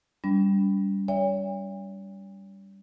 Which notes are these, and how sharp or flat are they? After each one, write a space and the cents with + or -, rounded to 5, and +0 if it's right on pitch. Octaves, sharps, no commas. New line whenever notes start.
G3 +0 D4 -45 B5 +15
C#5 +40 E5 +0 G5 +45